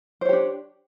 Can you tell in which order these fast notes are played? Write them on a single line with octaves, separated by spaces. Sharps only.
C5 C#5 G4 D4